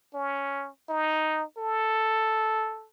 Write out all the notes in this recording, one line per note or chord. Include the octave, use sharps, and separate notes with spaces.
C#4
D#4
A4